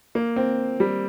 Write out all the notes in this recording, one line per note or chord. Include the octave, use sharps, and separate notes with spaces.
A#3
C4
G3